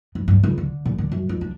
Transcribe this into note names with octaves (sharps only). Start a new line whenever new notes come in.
G2
G2
C#2
D3
A#2
D3
F#2
F2
D4